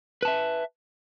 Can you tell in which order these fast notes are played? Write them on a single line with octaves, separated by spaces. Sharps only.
B4 A5 E5